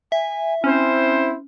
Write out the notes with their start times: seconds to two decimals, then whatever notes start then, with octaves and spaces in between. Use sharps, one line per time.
0.12 E5 G#5
0.64 C4 C#4 E4 C5